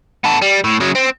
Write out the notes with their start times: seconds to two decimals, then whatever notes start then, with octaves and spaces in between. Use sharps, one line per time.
0.24 B3 A4
0.42 G3
0.64 A2
0.81 C#3 F#3
0.96 C4